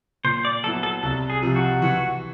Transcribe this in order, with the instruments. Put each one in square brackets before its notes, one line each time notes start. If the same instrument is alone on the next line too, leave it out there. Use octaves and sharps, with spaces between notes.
[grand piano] A#2 [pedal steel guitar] C5
[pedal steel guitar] D5
[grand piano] F#3 B3 E4 [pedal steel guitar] A4
[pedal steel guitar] A4
[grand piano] C2 [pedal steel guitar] A4
[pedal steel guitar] G#4
[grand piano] C3 F3
[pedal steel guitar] F#4
[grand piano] E3